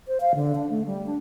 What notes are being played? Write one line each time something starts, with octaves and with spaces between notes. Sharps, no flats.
C5
F5
D3
D4
A3
G3
D4